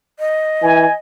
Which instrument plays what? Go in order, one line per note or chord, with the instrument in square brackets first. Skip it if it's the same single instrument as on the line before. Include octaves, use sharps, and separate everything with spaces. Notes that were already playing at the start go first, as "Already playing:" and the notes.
[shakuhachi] D#5
[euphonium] E3 [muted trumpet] G#5